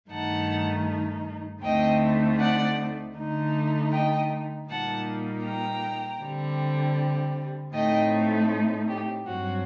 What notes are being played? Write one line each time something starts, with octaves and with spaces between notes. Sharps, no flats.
G2 D#3 A3 D#4 F#5 A5
D2 D3 A3 C4 D#4 D#5 G5
D5 F#5
D3 A3 D#4
D#5 G5
A#2 G3 A#3 D#4 F#5 A5
G5 A#5
D3 G3 C4
A2 A3 C4 D#4 D#5 G5
G4
G2 F#3 C4 F#4